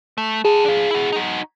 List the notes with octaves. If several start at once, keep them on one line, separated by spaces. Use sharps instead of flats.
A3
F#4 G#4 A4
D4 F4
E4 F#4
D#4 F#4